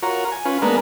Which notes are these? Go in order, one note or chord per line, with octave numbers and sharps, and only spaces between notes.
F4 F#4 A#4 C#5 A#5
G#5
C#4 F4 B4
G#3 A#3 B3 D4 A#4 B4